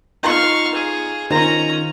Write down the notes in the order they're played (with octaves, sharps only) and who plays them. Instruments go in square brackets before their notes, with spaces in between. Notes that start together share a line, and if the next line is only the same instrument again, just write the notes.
[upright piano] D#4 F4 A#5 [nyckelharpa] F5 C#6
[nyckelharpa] G#4
[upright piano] D#3 F4 C5 [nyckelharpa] C#4 A#5